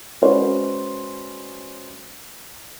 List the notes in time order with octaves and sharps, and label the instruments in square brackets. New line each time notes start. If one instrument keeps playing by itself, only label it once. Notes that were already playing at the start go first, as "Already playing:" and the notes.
[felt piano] G#3 C#4 F#4 B4 C5 D5